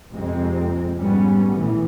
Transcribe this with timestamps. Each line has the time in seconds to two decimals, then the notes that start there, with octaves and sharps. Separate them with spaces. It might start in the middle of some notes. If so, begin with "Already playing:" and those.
0.10 A#1 F2 C3 G#3 C4
0.96 G#2 G3 B3 C#4
1.54 A#1 A2 E3